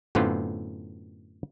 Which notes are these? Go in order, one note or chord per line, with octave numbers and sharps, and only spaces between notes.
F#2 A2 D3 B3 C4 F4